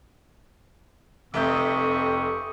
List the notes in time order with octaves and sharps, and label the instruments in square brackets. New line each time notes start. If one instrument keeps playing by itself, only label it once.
[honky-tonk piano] F1 E5 G6 [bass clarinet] F2 [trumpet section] G4 C#6 D#6